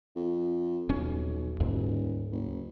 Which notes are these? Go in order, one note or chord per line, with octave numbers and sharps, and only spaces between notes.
F2
D#1 B1 C#4
D#1 D2 G#2
F#1